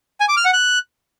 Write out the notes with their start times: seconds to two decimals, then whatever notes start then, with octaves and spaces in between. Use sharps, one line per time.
0.20 G#5
0.29 D6
0.37 F6
0.45 F#5
0.53 F#6